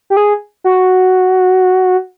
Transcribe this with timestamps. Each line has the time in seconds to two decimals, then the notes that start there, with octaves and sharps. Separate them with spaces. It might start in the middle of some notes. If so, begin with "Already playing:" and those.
0.10 G4
0.17 G#4
0.64 F#4